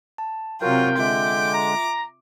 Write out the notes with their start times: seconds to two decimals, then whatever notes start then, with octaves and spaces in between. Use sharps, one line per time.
0.18 A5
0.62 C3 F#3 F4 F#4 A#4 G5
0.98 D3 G#3 F4 E5 D6
1.54 A#5